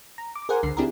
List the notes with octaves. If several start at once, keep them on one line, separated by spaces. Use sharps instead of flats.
A#5
D6
G#4 A#4 C5 F#5 G#5
C#2 D3 C7
C4 D4 E4 G4 G#4 A#4